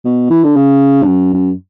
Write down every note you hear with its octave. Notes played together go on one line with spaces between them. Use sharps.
B2
E3
D3
C#3
G2
F#2
F#2